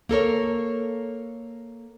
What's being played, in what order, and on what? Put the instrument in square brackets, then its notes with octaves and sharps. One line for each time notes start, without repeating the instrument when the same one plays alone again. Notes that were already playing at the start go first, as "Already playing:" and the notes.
[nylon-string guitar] A#3 A4 A#4 C#5